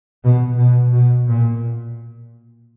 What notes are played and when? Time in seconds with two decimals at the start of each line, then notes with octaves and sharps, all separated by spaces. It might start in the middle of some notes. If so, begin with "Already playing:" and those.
0.23 B2
0.58 B2
0.94 B2
1.29 A#2